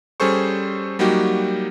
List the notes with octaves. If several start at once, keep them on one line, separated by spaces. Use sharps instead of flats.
G3 C#4 G#4 A4 C5 C#6
F#3 G3 A#3 D#4 F#4 G4